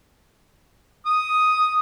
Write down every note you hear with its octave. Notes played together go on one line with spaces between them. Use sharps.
D#6